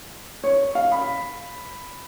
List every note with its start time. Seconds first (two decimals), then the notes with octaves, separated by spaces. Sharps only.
0.44 C#5
0.75 F5
0.92 B5